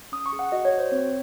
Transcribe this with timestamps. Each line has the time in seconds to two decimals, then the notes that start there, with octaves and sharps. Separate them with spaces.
0.12 C#4 D#6
0.26 C#6
0.33 G#4
0.39 F#5
0.52 F#4 D#5
0.65 C#5
0.72 F#4
0.78 C5
0.91 C4 C#5